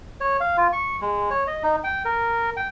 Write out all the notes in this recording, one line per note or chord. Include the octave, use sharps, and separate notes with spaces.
C#5
F5
F4
C#6
G#3
C#5
D#5
D#4
G5
A#4
G5